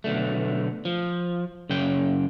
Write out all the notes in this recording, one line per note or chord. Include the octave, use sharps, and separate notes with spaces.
B1 D3 A3
F3
F#2 C#3 G5